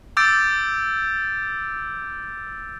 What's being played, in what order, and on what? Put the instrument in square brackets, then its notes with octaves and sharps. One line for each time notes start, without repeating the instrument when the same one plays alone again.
[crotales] D6 E6 G6 A6 D7